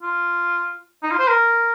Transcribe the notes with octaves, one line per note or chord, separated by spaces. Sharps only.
F4
D#4
F4
C5
A#4